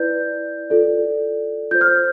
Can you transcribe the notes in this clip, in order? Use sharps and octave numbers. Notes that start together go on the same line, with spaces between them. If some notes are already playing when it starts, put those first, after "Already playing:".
Already playing: E4 B4 D5 G6
F4 A4 D5
F4 C5 G6
F6
G6